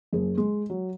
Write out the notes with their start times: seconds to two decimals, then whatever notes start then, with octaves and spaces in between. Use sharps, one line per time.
0.13 F#1 G#4
0.37 G#3
0.70 F#3